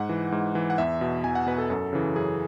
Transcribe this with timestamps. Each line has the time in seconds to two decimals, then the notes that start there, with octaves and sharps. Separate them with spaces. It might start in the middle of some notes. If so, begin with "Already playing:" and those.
Already playing: G#2 F#5
0.09 E3
0.32 G#2
0.55 E3
0.70 F#5
0.78 E2 E5
1.01 B2
1.24 E2 G#5
1.35 F#5
1.47 B2 B4
1.58 A4
1.70 F#2 A4
1.93 C#3 E3
2.16 F#2 G#4